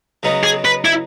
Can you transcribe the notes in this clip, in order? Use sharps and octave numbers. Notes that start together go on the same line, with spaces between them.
C#3 F#3 B3 D#4
G#4
B4
E4